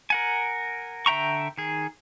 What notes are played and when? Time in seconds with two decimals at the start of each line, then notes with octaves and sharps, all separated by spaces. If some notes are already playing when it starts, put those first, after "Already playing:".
0.10 A#4 F#5 G#5
1.06 D3 E5 G5 A#5 C#6
1.58 D#3 G#4